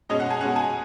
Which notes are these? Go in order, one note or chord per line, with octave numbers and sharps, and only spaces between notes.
B2 G#3 C#4 D#5
F#5
G#5
B2 G#3 C#4 F#5
G#5